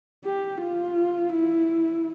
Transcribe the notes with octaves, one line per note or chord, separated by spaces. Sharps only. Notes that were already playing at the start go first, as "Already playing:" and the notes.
G4
F4
E4